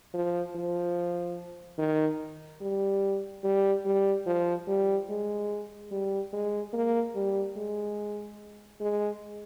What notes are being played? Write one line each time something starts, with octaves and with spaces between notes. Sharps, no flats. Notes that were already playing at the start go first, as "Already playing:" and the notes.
F3
F3
D#3
G3
G3
G3
F3
G3
G#3
G3
G#3
A#3
G3
G#3
G#3